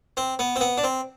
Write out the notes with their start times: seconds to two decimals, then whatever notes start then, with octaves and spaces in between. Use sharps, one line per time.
0.17 C4
0.39 B3
0.56 C4
0.61 B3
0.78 D4
0.84 C4